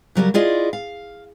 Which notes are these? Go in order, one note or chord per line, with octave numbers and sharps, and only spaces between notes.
C#3 F#3 G3 A#4
E4 F4 G#4 D5 D#5
F5